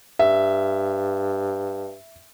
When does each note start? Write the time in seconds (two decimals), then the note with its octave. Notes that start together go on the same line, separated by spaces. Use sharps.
0.19 G2 E5